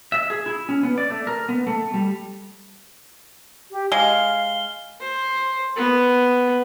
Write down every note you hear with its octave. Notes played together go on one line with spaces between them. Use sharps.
E5
G#4
E4
C#4
B3
D5
A3
A#4
B3
A3
G3
G4
G#3 F5 G7
C5
B3